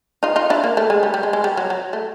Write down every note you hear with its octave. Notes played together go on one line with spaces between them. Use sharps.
D#4 F4
D#4 F4
D4 E4
A#3
A3
G#3
G3
G3
G#3
G#3
G3
F#3
F#3
A3